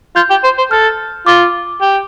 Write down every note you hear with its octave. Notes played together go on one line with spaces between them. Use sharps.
F4 G6
G4
C5
C5
A4 F6
F4 D6
G4